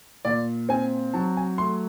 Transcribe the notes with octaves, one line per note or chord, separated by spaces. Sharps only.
A#2 D5
C4 G#5
F#3 A5
G#5
A3 C6